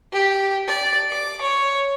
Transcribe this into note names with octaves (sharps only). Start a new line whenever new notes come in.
G4
D5
D6
C#5